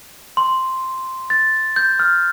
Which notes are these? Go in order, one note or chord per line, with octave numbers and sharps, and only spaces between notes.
C6
A6
G6
F6